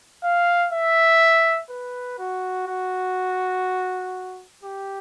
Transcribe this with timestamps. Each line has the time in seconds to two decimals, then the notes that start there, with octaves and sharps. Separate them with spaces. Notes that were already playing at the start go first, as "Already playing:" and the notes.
0.23 F5
0.73 E5
1.70 B4
2.19 F#4
2.67 F#4
4.63 G4